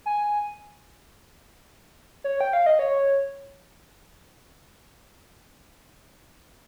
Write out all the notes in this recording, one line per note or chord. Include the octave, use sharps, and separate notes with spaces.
G#5
C#5
G5
F5
D#5
C#5